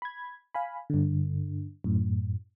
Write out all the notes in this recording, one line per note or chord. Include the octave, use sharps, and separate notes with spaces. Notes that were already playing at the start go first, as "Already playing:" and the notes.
B5 G#6
F5 G#5 B5
G2 D3
F#2 A2